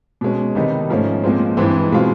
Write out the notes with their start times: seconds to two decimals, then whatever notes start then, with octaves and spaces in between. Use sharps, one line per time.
0.21 B2 G#3 C#4
0.55 C3 D#3 G3 B3 D#4
0.89 G#2 F3 A3 C#4
1.23 A#2 F3 G#3 C4
1.57 G2 E3 G#3 C4
1.92 B2 G#3 C4 F4